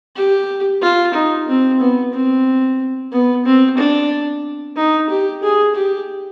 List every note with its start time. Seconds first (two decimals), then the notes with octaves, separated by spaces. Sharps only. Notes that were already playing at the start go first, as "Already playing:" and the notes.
0.16 G4
0.82 F4
1.14 D#4
1.48 C4
1.81 B3
2.13 C4
3.12 B3
3.46 C4
3.78 D4
4.76 D#4
5.10 G4
5.43 G#4
5.75 G4